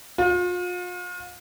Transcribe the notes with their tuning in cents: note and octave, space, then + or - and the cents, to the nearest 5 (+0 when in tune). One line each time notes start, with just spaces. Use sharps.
F4 +40